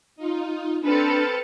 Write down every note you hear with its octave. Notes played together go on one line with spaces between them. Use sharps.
D#4 F4
C4 D4 A4 B4 F6 A6 C#7